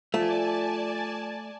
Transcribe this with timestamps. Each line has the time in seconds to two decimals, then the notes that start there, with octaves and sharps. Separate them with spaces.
0.14 F3 A3 D5 G#5 A5